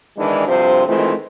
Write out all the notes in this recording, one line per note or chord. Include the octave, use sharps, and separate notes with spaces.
E2 D#3 E3 G#3 D4
D2 G2 C3 F3 C5
D#3 E3 G#3 A3 C4 F4